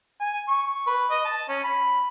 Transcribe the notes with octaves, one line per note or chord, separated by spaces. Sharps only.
G#5
C#6
B4
D#5
A5
C#4
B5